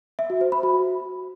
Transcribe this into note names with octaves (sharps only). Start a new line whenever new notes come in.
E5
F#4
C5
B5
F#4